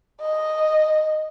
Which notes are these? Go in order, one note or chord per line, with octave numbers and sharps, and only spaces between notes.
D#5